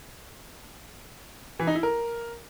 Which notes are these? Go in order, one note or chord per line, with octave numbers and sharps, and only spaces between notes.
E3
D#4
E4
A#4